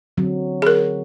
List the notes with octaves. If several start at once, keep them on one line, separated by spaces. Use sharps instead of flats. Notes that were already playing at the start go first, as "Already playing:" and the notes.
D3 F#3 C4
G#4 A#4